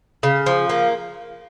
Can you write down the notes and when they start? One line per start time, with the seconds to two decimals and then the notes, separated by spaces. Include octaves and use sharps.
0.23 C#3
0.46 F3
0.70 A#3